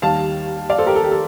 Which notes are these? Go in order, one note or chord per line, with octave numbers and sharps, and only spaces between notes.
D#2 D#3 G3 F5 A5
D5 F5
A4 C5
G4 A#4
A4
G4
A4